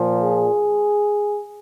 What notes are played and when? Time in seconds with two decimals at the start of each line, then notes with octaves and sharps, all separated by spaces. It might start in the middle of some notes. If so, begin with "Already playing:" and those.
Already playing: A#2 F3
0.21 G#4